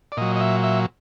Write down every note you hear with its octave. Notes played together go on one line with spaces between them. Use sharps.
D5
A#2 F#3 D#5
D#5
E5
E5